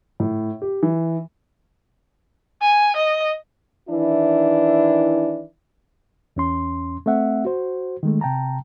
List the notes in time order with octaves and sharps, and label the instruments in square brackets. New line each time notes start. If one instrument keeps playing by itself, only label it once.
[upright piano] A2
G4
E3
[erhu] G#5
D#5
[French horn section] D#3 E3 D4 E4
[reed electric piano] E2 C#4 C6
A3 C4 E5 F#5
F#4 C5
D#3 G#3 A3
C3 G5 A5 A#5